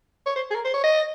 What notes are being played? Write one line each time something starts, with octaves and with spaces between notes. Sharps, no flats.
C#5
C5
G#4
A#4
C5
C#5
D#5